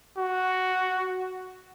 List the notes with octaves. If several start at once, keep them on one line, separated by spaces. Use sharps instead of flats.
F#4